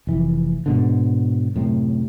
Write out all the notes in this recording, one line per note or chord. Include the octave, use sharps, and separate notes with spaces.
F1 E3
G#2 B2 D3
F#2 A2 C3